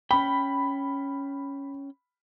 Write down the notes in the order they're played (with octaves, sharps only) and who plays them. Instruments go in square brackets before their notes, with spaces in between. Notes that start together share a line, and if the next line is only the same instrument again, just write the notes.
[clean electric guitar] C#4 G5 [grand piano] B5